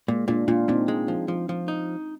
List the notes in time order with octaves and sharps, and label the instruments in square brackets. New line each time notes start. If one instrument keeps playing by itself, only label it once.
[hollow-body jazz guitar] A#2 [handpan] G#3
[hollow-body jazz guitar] A#2 [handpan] D4 F4
[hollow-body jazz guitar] A#2 [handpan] D4 F4
[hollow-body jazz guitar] A#2 [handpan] C4 D#4
[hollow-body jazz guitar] G#3
F3
F3
F3
D#4